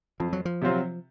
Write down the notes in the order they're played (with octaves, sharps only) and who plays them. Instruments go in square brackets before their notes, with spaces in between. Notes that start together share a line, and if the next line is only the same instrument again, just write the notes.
[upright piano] F2 [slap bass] F3
[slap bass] F#3
F3
[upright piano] C3 F#3 C4 F4